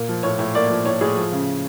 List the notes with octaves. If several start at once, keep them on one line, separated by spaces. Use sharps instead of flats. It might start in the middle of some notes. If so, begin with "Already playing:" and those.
Already playing: A#2 A#3
F3
A2 C#5
A2
A#3 D5
F3
A2 C#5
A2 G#4
F3
C#3